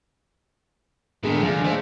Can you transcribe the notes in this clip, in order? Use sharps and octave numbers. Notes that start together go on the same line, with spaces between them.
A2 D3 D#3 G#3 A#3 B3 D4
D#2 F3 D5 E5 F5 G#5
A3 D4 C5